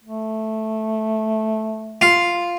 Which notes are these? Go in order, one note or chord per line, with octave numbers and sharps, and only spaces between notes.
A3
F4